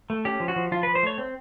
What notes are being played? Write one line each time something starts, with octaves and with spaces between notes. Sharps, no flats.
A3
C#4 G4
F3
F#4
F3
F3 F4
B4
F3
C5
A3 C#5
C4